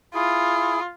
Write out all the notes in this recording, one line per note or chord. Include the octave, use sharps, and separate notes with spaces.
E4 F4 G#4